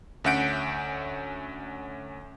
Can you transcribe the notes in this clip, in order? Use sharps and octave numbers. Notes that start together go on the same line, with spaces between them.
D2 C#4 E5 F#5 G6 D7